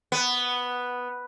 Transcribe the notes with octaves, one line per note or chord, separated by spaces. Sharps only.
B3